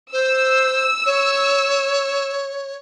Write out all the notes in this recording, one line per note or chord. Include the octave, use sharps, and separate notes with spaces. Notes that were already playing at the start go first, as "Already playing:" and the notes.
C5 E6
C#5